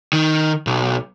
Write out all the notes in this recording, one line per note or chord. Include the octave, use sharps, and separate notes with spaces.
D#3
B1